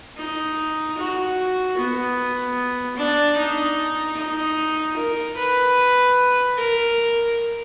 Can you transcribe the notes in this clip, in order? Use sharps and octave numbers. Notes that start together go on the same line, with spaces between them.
D#4
F#4
B3
D4
D#4
D#4
A#4
B4
A#4